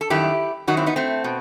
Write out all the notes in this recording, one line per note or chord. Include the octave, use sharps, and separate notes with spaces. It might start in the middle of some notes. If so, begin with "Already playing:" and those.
A4
F#2 D#3 G3 E4 G4
F#2 D#3 F#3 D#4 F#4
C4 E4
B3 D#4
A3 C4
B2